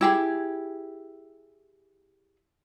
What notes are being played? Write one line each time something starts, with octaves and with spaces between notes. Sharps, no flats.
E4 G4 G#4